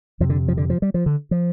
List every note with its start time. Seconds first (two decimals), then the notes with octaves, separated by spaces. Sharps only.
0.20 F2 C3 F3
0.30 D3
0.48 F3
0.57 D3
0.70 F3
0.82 G3
0.94 F3
1.06 D3
1.31 F3